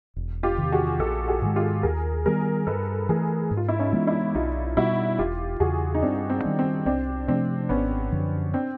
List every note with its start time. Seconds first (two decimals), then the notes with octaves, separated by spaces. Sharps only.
0.16 E1
0.43 F4 G4
0.58 E2 C3 D#3
0.72 F#4 G#4
0.99 A#1 G4 A4
1.28 F#4 G#4
1.42 G#2 D#3 G#3
1.56 F4 G4
1.83 D#2 G#4 A#4
2.26 D#3 G3 B3 G#4 A#4
2.67 G2 A4 B4
3.09 E3 A3 G#4 A#4
3.51 G#2
3.57 F4
3.69 E4
3.79 C#4 D#4
3.93 E3 G#3 B3
4.07 D4 E4
4.35 B1 D#4 F4
4.76 B2 G3 B3 E4 F#4
5.18 E1 F4 G4
5.60 E2 C#3 F#4 G#4
5.94 D#4
6.02 G2 C4 D4
6.30 C4
6.44 D#3 G3 B3
6.59 C4
6.86 C2 C4 D4
7.28 C3 F3 A3 C4 D4
7.69 G#1 B3 C#4
8.12 F#2 D3 F3
8.53 C4 D4